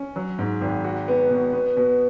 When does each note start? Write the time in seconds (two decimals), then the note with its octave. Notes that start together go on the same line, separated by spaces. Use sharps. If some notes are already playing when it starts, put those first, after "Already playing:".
Already playing: C#4
0.16 F#3
0.39 G#2
0.62 G#1
0.84 F#4
1.08 B3
1.30 B2
1.53 B3
1.77 B2